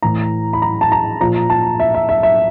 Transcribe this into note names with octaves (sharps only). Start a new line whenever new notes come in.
A2 E3 A#5
B5
A#5
A5
A#5
A#2 F3 A#5
A5
E5
E5
E5
E5